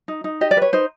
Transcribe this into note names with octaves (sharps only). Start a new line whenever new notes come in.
D#4
D#4
G4 D#5
D5
B4 C#5
D#4 C5